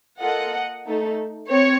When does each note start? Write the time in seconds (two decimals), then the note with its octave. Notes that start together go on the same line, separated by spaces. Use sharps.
0.21 A#3 F4 A4 D#5 F#5
0.85 A3 D#4 A4
1.49 C4 C#5